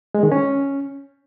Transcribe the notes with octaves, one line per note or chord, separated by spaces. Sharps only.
G#3
D#3
C#4